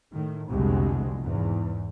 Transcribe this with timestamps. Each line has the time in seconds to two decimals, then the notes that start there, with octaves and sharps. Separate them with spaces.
0.13 A2 D#3
0.51 C2 F2 B2 D3 G#3
1.21 E2 G#2